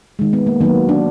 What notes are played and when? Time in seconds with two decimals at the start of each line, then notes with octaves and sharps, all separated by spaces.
0.19 D#3 G#3
0.33 B3
0.47 A#3
0.61 D#3 F#3 A#3 B3
0.89 D4